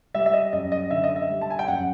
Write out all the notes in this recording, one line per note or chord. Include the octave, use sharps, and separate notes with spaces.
G3 E5
E5
D#5
F#2 D#5
D#5
D3 E5
D#5
E5
G3
A5
G#5
G5
F#2 F#5